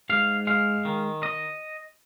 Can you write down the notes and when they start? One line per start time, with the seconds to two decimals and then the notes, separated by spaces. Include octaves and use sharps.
0.10 G#2 F5
0.47 G#3 F5
0.85 D#3
1.23 D#5